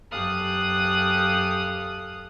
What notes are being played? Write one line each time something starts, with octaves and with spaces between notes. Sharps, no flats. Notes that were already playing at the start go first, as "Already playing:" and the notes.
F#2 G4 A4 F5 D#6 F#6